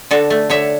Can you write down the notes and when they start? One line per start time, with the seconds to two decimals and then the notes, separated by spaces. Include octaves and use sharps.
0.11 D3 F#4 A4
0.30 A3
0.50 D3 C#5 E5